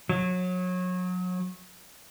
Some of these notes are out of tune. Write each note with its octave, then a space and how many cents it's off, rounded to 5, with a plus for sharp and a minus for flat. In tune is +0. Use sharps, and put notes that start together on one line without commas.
F#3 -30